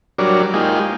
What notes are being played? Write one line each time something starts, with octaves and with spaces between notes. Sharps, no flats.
F#3 G3 D4 A#4 C#5 D5
G#3 A#3 D#4 F4 G4 G#4